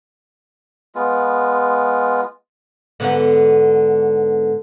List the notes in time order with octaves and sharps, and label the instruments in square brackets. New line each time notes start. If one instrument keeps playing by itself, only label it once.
[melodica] G#3 B3 F4
[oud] G#2 D3 B3